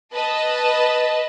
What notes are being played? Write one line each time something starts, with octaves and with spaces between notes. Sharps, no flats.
B4 D#5 A5